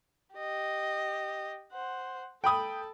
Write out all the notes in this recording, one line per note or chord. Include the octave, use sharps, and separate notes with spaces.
G4 D#5
C5 F#5
A4 G5 B5 D#6